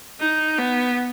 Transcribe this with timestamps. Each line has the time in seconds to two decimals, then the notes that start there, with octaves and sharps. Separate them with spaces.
0.20 D#4
0.58 B3